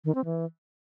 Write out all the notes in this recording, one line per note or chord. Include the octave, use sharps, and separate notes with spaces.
D#3
C4
E3